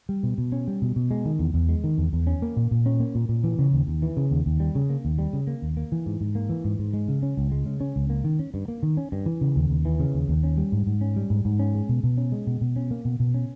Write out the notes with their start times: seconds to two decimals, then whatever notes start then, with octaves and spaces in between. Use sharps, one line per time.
0.09 G3
0.23 B2
0.38 B2
0.52 C#4
0.68 G3
0.82 B2
0.96 B2
1.11 G#3
1.25 D#3
1.39 E2
1.54 E2
1.69 G#3
1.84 D#3
1.98 E2
2.13 E2
2.27 C#4
2.42 A#3
2.57 A#2
2.71 A#2
2.86 C#4
3.00 A#3
3.15 A#2
3.29 A#2
3.44 E3
3.59 C#3
3.73 D#2
3.87 D#2
4.02 E3
4.17 C#3
4.31 D#2
4.46 D#2
4.60 G3
4.75 C#3
4.90 A#3
5.05 D#2
5.18 G3
5.33 C#3
5.47 A#3
5.62 D#2
5.77 A#3
5.92 E3
6.06 G#2
6.21 G#2
6.35 A#3
6.49 E3
6.64 G#2
6.79 G#2
6.94 G#3
7.08 C#3
7.23 C#4
7.37 C#2
7.52 G#3
7.66 C#3
7.80 C#4
7.96 C#2
8.10 A#3
8.24 D#3
8.39 C#4
8.54 G2
8.68 A#3
8.83 D#3
8.97 C#4
9.12 G2
9.26 E3
9.41 C#3
9.56 D#2
9.70 D#2
9.85 E3
10.00 C#3
10.14 D#2
10.28 D#2
10.43 C#4
10.57 G3
10.72 G#2
10.87 G#2
11.01 C#4
11.16 G3
11.30 G#2
11.45 G#2
11.59 C#4
11.75 G#3
11.89 B2
12.03 B2
12.17 C#4
12.32 G#3
12.47 B2
12.61 B2
12.76 C#4
12.91 A#3
13.05 B2
13.20 B2
13.34 C#4